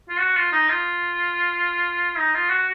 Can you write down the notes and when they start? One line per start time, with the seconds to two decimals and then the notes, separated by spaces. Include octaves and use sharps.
0.09 F4
0.20 F#4
0.37 F4
0.53 D#4
0.69 F4
2.17 D#4
2.34 F4
2.50 F#4